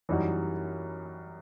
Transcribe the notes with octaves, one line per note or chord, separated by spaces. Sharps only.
F#2 E3 G3 D#4 F#4